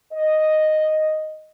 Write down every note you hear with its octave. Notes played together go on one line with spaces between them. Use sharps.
D#5